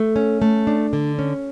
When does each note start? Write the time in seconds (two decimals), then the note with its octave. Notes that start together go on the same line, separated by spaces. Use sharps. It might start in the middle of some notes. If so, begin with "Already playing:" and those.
Already playing: A3
0.16 C#4
0.42 A3
0.67 D4
0.93 D3
1.19 C#4